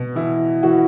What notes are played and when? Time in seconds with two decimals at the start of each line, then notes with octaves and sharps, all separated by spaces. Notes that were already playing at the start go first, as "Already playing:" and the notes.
Already playing: B2
0.16 E3 E4
0.63 E3 F#4